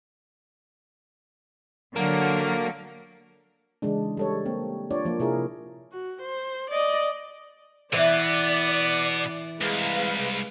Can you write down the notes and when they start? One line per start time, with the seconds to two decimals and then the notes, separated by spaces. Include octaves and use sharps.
1.96 D3 F#3 A#3
3.82 C#3 E3 G#3 D4
4.17 G3 A4 C#5
4.46 A#3 C4
4.91 D4 F4 C#5 D5
5.05 F3 A#3
5.20 C3 E4 G#4 A#4
5.92 F#4
6.22 C5
6.70 D5 D#5
7.93 B2 E3 B3 D5
9.61 C2 G#3 B4 F5